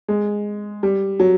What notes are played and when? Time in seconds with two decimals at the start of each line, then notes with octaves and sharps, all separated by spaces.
0.08 G#3
0.83 G3
1.20 F#3